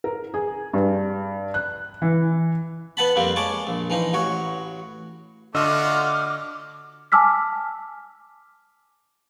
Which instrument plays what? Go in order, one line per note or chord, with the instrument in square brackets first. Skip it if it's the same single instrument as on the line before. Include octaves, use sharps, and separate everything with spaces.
[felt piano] A#4
G#4
G2
F#6
E3
[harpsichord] B3 B4 F#5 A5 B5
F2 G3 A#3 C4
G#3 C#5 A5 D6
A#1
E3 F3 D#4
A1 F#4 C#5
[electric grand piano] D3 D#5 E6 [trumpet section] A3 F4 F#4 [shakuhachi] D6 [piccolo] F6
[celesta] G#5 A5 D6 E6 F6 B6